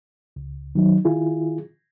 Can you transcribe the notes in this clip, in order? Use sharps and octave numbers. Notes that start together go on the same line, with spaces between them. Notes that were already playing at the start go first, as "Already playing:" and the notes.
C#2
D#3 F#3 D#4
D#3 E4 F4 G#4